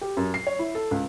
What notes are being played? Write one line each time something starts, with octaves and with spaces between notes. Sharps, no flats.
G4
F#2
C7
C#5
E4
A4
C#2